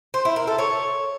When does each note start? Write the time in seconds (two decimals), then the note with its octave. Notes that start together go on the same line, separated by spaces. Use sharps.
0.14 C5
0.25 E4
0.36 A#4
0.47 A4
0.59 C#5